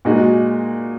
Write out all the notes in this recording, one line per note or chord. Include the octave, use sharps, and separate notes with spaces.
A#2 G#3 D#4 F#4